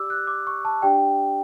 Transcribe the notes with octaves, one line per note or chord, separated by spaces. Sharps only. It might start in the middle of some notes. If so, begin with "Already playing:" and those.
Already playing: G4 D5 D6 E6
F#6
D6
C#6
A5
D4 G4 D5 G5